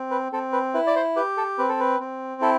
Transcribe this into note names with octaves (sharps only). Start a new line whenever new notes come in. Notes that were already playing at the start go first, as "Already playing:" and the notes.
Already playing: C4
B4
C4 A4
B4
E4 B4
D5
C5
G4 B4
A4
C4 B4
A4
B4
C4
E4 A4